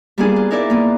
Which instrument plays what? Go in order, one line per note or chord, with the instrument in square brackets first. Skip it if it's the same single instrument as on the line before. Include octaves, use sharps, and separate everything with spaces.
[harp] G3 A#3 B3 D4 F4 G#4
F4
D#4 E4 A#4 D5 E5
A#3 B3